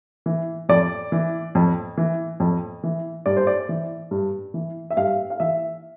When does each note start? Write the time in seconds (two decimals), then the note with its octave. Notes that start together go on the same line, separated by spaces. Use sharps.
0.26 E3
0.69 F2 D5
1.12 E3
1.55 F2
1.97 E3
2.40 F2
2.83 E3
3.26 G2 D5
3.37 C5
3.47 D5
3.69 E3
4.11 G2
4.54 E3
4.91 E5
4.97 G2 F5
5.30 F5
5.40 E3 E5